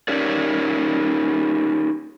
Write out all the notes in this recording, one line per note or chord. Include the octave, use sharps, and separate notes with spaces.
C#4 D#4 G4 A#4 C#5 D5